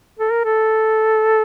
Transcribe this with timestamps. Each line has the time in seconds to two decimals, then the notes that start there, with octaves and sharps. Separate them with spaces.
0.19 A4
0.32 A#4
0.44 A4